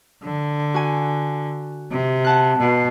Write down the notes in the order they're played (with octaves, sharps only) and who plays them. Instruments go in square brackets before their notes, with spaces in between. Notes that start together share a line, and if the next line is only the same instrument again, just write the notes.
[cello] D3
[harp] F#4 G#5
[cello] C3
[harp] F#5 A5 F#6
[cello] B2